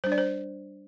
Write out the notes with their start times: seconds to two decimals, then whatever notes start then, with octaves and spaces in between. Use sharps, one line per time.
0.04 G3 D4 C5
0.12 D5
0.18 C5